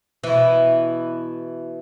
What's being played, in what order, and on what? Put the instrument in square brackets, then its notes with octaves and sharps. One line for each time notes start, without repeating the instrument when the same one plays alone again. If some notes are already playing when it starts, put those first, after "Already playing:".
[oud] B2 E3